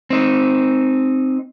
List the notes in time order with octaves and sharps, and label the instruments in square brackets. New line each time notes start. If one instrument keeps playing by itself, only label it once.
[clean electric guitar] C4 D#4